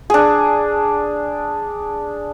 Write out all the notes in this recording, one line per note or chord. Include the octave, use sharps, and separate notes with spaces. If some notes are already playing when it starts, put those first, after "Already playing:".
D4 G#4